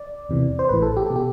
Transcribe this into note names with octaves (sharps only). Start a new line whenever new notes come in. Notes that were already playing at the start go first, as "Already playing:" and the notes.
Already playing: D5
E2 C3 E3
C5
A1 A2 E3 B4
A4
G4
B2 A4
G4